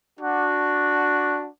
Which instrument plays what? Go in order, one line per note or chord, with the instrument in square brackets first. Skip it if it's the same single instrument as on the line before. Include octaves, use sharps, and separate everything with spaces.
[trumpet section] D4 F#4